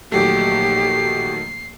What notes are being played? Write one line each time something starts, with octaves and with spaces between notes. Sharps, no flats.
A#1 D#3 F#3 A3 G4 C7